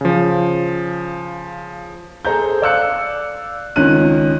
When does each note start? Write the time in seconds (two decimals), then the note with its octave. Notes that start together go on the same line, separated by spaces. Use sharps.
0.01 C#3 F3
2.25 G#4 A4 C5 A#5 G6
2.62 D5 F5 E6 F#6 C#7
3.76 C#2 D#3 C#4 F#6 D#7